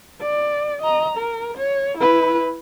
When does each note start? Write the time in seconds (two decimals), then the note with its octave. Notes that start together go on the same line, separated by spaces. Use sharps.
0.22 D5
0.82 D#5 A#5
1.18 A#4
1.57 C#5
1.98 E4 B4